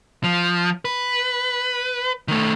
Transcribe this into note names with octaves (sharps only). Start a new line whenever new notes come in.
F3
B4
D#3 A3